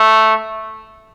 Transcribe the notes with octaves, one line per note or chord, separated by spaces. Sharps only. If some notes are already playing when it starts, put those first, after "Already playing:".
Already playing: A3